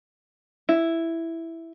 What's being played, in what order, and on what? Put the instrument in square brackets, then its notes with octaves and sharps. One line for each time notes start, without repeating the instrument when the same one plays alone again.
[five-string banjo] E4